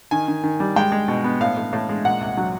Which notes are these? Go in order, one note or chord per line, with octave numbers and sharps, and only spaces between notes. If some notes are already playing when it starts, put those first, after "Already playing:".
D#3 G#5
D#3
D#3
G3
G#3 G5
G#3
B2
B3
A2 F5
A2
A2
G#3
A#2 F#5
C2
F#3